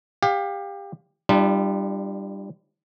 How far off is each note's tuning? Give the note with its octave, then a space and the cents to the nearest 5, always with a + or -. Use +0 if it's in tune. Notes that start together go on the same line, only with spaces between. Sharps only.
G4 +25 F5 +25
G3 +0 D4 +40 F4 -30